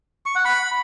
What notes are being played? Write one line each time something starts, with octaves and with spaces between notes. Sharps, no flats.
C#6
F#5
B5